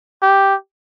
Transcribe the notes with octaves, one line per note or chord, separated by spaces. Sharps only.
G4